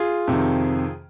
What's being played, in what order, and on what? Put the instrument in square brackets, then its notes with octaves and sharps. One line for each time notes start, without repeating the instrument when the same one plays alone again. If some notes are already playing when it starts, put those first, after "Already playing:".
Already playing: [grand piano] F4 G#4
F2 C3 D#3